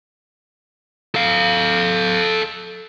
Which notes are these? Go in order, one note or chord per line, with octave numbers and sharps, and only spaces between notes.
A4 F5